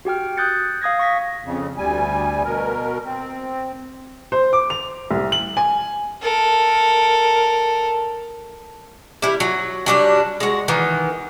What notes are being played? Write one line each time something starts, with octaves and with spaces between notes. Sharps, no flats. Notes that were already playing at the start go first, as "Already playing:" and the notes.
F#4 G4 G5 F6
D#6 F#6 G6 A6 C#7
F5 D#6 G#6 A#6
C#6 A#6 B6
F2 C#3
D2 G3 G#5
B2 A#4
C4
C5
D6
F7
C2
F#7
G#5
A4 A#4
G3 E4
F#3
F#3 G3 D4
G#3 F#4
D#3 E3 B3